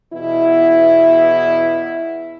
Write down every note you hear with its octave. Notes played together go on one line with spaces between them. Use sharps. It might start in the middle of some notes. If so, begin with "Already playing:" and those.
E2 B2 E4